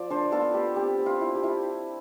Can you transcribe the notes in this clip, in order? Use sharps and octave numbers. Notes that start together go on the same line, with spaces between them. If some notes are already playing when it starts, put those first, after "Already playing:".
Already playing: F3 D5
D4 A4 C5
B3 F4 A4
B3 G4
C4 G4
C4
F4
E4
G4
E4